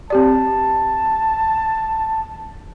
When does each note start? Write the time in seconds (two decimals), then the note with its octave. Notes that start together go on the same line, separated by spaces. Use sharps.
0.10 C4 G4 D5 A5